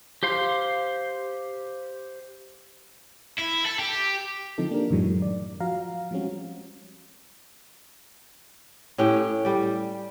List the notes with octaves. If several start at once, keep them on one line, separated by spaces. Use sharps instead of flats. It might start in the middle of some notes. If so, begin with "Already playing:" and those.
G4 C5 F5 C6
E4
A4
G4
D3 F3 C4 D#4 A4
A#3 D4 G4 A#4
F#2 A2 D#3 E3 F#3 G#3
D5
F3 F#4 F5 A#5
F3 G3 G#3 C4 C#4 F#4
A2 C#4 G4 G5
G3 D5